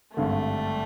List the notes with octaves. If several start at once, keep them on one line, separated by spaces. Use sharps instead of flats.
G#1 G2 D3 G3 A3